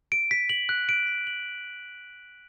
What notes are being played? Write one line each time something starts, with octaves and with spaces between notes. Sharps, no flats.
D7
B6
F#7
F#6
D7
B6
F#7